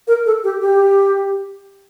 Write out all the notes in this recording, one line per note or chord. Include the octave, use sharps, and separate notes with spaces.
A#4
A4
G4
G4